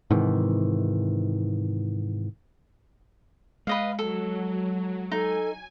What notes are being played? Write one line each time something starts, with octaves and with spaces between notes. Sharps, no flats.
G#2 C3 D#3 E3
G#3 B4 D#5 F5
F#3 A4
D#4 A4 G#5